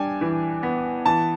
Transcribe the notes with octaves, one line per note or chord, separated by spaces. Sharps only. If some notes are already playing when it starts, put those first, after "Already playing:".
Already playing: G3 D4 G5 G#5
E3
B3
E3 A5